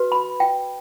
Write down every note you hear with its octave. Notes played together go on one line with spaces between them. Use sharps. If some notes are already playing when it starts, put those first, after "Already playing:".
Already playing: F#4 B4
B5
G5